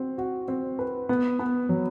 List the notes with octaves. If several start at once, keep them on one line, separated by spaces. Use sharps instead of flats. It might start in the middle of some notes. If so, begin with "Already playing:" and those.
Already playing: C4 F#4
F#4
C4
B4
B3
B3
F#3